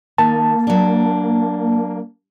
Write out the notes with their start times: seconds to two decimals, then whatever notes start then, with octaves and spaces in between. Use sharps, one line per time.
0.18 D#3 A#3 A5
0.67 F#3 D4